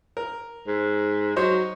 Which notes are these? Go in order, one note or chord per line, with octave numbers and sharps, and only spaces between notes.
A#4
G#2
F#3 D#4 C5 C#5